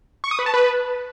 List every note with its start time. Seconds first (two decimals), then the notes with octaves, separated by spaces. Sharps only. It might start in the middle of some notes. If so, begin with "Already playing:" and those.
0.24 C#6
0.31 D#6
0.39 B4
0.46 A5
0.54 B4